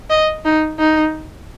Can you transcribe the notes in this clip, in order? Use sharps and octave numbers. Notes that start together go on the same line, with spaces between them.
D#5
D#4
D#4